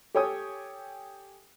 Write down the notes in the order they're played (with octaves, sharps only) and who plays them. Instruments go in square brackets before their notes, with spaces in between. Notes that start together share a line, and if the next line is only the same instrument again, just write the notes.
[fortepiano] G4 A4 C#5 G5 G#5 D#6